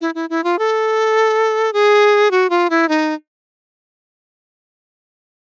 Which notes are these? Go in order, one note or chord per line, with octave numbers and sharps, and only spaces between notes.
E4
E4
E4
F4
A4
G#4
F#4
F4
E4
D#4